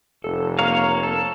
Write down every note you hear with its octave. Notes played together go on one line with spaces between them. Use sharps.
F1 A4
A#3 C#5 F5 A#5
A4